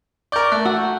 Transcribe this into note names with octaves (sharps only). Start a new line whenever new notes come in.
A#4 D5 C#6 G6
A3 F#6
F#4 E6